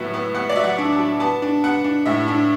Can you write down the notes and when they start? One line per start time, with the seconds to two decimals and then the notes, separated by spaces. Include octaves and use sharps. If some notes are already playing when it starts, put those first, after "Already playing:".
Already playing: A2 F#3 B3 E5
0.14 B3
0.34 B3 F#5
0.50 D5
0.56 F#3 E5
0.64 F#5
0.78 D4
0.93 A5
0.99 F#3
1.20 B3 A5
1.42 D4
1.64 B3 F#5
1.84 D4
2.06 A2 E5
2.28 D4